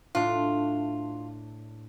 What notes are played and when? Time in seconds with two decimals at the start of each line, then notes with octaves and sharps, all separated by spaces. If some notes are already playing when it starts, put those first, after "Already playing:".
0.15 A2 D4 F4